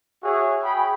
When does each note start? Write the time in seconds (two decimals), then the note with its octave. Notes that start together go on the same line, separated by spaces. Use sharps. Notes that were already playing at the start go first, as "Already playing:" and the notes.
0.24 F#4 G#4 C#5 E5
0.63 G#4 G5 B5